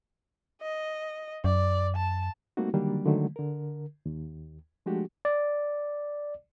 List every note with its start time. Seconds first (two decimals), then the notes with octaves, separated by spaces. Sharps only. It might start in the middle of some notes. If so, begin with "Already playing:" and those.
0.62 D#5
1.44 F#2 D5
1.96 A5
2.57 G3 A3 A#3 C4 D#4 F#4
2.74 D3 D#3 F#3 G3 A#3 D4
3.05 D3 D#3 F#3 G#3 A3
3.36 D3 A#4
4.06 D#2
4.86 F3 G#3 A3 D4 F#4 G4
5.25 D5